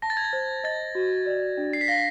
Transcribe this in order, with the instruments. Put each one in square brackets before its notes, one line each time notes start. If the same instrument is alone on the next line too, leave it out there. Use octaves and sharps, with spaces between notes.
[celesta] A5 [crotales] A#6
[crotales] A6
G#6
A6
[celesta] C5
[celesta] D#5 [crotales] A6
[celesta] F#4
D5
D4
[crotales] C7
B6
[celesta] F5 [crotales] A#6